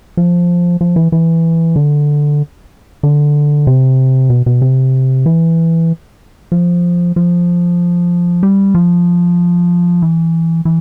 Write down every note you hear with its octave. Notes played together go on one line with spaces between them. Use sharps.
F3
F3
E3
E3
D3
D3
C3
B2
B2
C3
E3
F3
F3
G3
F3
E3
E3